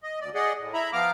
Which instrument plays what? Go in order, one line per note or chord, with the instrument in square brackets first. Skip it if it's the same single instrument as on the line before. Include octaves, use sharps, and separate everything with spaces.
[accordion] D#5
D2 D5
G#4 D5 D#5 F#5
A2
E4 E5 A#5 B5
F3 B3 F5 A#5 D6 F6